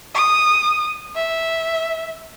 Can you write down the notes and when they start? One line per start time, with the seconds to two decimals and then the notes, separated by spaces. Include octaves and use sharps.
0.15 D#6
1.15 E5